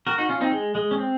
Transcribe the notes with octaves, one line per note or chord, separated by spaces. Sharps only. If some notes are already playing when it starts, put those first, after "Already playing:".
F#4 A#4
D#4 F#4
C#4 F4
C4 D#4
G#3
G#3
C#4
C4